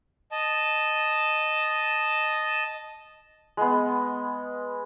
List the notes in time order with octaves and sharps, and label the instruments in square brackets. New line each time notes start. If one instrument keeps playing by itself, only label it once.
[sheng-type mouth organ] D#5 A5
[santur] G#3 B3